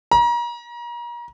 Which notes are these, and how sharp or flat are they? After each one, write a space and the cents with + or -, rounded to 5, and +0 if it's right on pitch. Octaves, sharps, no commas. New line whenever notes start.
A#5 +35